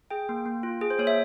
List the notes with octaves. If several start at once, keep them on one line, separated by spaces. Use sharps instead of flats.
G#4 G5
A#3
A#3
F4
G#4
C5
A#3 C#5
E5